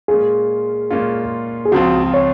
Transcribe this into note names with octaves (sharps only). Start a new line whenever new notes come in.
A#2 G#3 C#4 F4 G#4
A#2 G#3 C#4 F4
G#4
C#2 C#3 F3 C4 F4 F#4
C#5